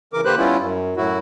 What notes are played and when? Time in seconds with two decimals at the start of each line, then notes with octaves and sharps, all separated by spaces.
0.13 C#3 E3 A#4 D6
0.25 D3 A#3 G4 B4 C5 F#6
0.38 G3 B3 C#4 E4 F4
0.59 F#2
0.97 F#2 A2 F#3 E4 F#4